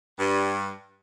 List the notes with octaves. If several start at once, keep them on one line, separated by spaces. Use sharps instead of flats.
G2